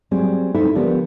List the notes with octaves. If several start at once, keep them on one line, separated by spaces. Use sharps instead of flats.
F#3 G3 C4 G#4
D#4 E4 A4 C5 E5
D3 F3 B3 D4 G4 A#4